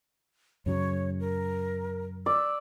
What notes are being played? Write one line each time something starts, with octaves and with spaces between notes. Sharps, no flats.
F#2 C#3 F#3 C#5
A#4
D5 E6